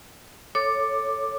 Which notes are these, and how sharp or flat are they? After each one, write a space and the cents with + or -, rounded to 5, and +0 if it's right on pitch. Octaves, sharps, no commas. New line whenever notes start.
A4 +0 C#5 +0 D6 +10